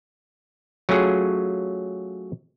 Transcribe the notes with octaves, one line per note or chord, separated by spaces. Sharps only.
F#3 A3 C#4 F4 G#4